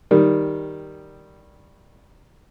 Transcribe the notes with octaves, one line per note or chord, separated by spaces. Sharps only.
D#3 G3